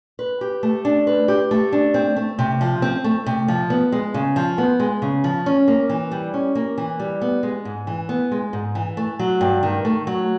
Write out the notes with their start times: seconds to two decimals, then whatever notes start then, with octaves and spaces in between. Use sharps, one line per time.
0.19 B4
0.41 G4
0.63 A3
0.85 D4
1.07 B4
1.28 G4
1.51 A3
1.73 D4
1.94 C4
2.16 A3
2.39 C3
2.61 F3
2.82 C4
3.04 A3
3.26 C3
3.48 F3
3.70 B3
3.92 G#3
4.14 C#3
4.36 F3
4.58 B3
4.80 G#3
5.02 C#3
5.24 F3
5.46 C#4
5.68 A#3
5.90 E3
6.12 G3
6.34 C#4
6.55 A#3
6.78 E3
7.00 G3
7.22 B3
7.43 G#3
7.65 G#2
7.87 E3
8.09 B3
8.32 G#3
8.53 G#2
8.75 E3
8.97 A3
9.19 F#3
9.41 G2
9.63 D#3
9.85 A3
10.07 F#3